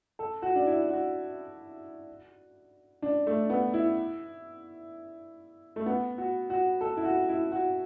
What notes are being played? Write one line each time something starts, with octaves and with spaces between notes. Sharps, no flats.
A4
F#4
D4
E4
F#4
D4
A3
B3
E4
A3
B3
F#4
F#4
A4
E4
F#4
E4
F#4